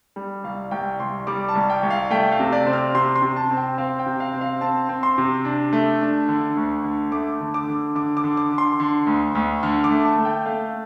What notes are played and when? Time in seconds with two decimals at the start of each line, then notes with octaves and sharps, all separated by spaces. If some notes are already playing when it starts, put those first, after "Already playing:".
0.16 G3
0.44 C2 F5
0.71 C2 G5
1.00 C2 C6
1.27 G3 D6
1.49 A5
1.55 C2
1.70 G5
1.83 C2
1.90 F5
2.10 A3 G5
2.32 F5
2.39 C3
2.52 D5
2.67 C4
2.73 F6
2.94 C3 C6
3.16 C6
3.22 C3
3.36 A5
3.51 C4
3.57 G5
3.78 C4 F5
3.99 G5
4.06 C3
4.20 F5
4.34 C4
4.41 F5
4.61 C4 A5
4.89 C4
5.03 C6
5.18 C3
5.45 D4
5.73 A3
6.01 D4
6.28 D3
6.57 D2
6.84 D3
7.12 A3 D6
7.41 D3
7.54 D6
7.68 D3
7.95 D3 D6
8.17 D6
8.24 D3
8.37 D6
8.52 D3
8.58 C6
8.80 D3
9.07 D2
9.35 D2
9.63 D3 F6
9.84 D6
9.90 A3
10.05 A5
10.18 A3
10.25 G5
10.46 A3 F5